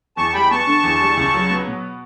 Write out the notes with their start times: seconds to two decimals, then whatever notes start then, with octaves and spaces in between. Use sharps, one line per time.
0.17 E2 A5 C#6
0.29 A5
0.33 G3 G5 B5
0.50 B3 A5 C#6
0.67 D3
0.83 E2
1.01 G3
1.17 C#2
1.34 F#3
1.50 B3
1.67 B2